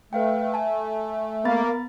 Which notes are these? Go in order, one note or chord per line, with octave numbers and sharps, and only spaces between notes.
A3 B4 F5 G5
G#5 A5
A#3 B3 B5 A6